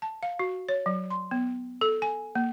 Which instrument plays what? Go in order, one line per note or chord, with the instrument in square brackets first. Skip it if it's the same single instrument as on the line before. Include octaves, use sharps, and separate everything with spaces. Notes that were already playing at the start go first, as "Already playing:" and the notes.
[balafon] A5
F5
F#4
C#5
F#3
C6
B3
A4
G#5
A#3